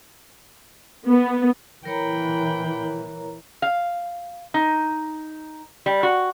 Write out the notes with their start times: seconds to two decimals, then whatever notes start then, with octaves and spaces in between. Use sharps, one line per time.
1.07 B3
1.85 A#2 E3 A#4 C#5 G5 A#5 B5
3.62 F5
4.54 D#4
5.86 G3
6.03 F#4